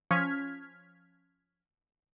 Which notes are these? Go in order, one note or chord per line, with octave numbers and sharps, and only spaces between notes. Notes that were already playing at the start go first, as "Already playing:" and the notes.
F3 C#4 F6 G#6 B6